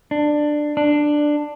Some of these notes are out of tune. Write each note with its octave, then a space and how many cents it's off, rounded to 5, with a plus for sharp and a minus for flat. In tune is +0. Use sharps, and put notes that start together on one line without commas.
D4 +15
D4 +10